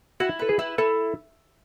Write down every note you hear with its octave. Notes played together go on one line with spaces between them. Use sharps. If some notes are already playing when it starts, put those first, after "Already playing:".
E4 F#4
A4 B4
G#4
E4
E4 A4